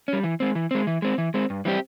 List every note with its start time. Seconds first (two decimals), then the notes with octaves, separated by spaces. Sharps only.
0.08 G3 C#4
0.24 E3
0.40 G#3 C4
0.55 E3
0.71 G#3 C4
0.87 E3
1.02 G#3 C4
1.18 E3
1.34 G#3 C4
1.50 G2
1.65 E3 G3 C4 G4